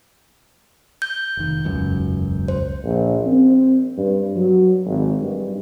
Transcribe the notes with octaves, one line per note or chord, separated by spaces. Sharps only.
G6
F1 D#3
E1 C#2 F#2
C5
A#1
C4
G2
F#3
G#1
G2